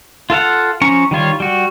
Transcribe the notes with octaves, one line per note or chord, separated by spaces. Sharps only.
F4 A4 F5 F#5
F3 C#4 A#5 C#6
D#3 G3 F4 C#5
G3 F#4